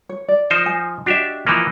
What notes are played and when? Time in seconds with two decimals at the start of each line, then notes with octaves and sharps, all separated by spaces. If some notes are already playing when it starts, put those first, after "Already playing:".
0.09 C#5
0.28 D5
0.50 F3 D#4 C5
0.66 G#5
1.06 D4 F#4 G4 D#5 E5
1.47 E3 F3 A#3